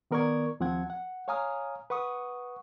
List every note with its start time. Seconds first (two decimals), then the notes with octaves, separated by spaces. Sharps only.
0.11 D#3 B3 A#4 D5 C#6 G#6
0.60 D#2 F3 C4 F#5 G#6
0.90 F#5
1.28 C#5 F5 G#5 A#5 D#6 F6
1.90 B4 F#5 C#6 D#6